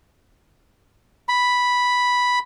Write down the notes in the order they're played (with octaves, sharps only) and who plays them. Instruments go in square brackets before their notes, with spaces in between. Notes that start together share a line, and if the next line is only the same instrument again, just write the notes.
[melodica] B5